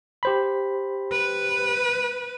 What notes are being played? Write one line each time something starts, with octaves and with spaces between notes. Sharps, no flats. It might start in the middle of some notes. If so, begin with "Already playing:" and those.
G4 C5 B5
B4